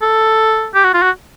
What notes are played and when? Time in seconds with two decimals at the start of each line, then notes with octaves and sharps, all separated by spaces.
0.02 A4
0.74 G4
0.84 F#4
0.94 F4
1.02 F#4